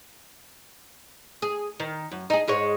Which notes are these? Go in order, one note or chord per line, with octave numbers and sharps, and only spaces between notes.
G#4
D#3
F#2
D#4 G#4
G#2 G#3 C#5